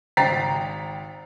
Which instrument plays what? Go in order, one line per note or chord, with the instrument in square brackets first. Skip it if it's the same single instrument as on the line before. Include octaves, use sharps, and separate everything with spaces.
[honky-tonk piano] G#1 G5 A#5 A6 B6 C7